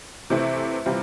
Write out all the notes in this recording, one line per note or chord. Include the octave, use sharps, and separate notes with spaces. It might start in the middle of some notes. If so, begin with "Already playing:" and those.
C3 E3 A3 C4 E4
C3 E3 G3 C4 F4